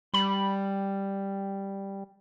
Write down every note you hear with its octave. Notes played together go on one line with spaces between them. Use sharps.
G3 B5